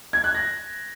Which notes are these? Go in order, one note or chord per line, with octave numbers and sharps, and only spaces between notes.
G#6
F#6
A#6